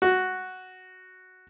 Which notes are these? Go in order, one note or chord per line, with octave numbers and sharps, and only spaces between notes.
F#4